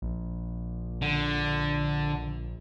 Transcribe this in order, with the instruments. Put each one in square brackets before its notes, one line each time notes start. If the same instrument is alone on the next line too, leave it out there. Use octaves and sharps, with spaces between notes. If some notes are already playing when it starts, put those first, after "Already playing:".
[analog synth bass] A#1
[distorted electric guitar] D3